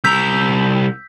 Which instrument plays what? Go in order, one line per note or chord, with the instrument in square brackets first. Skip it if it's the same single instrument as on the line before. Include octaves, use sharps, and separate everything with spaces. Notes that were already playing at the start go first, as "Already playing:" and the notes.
[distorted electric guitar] C2 A#5 [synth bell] E6 G6 B6